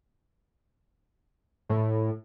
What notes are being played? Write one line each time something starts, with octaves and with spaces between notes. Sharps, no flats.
A2